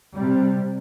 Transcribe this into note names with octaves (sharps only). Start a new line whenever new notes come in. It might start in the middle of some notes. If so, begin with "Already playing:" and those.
C3 G3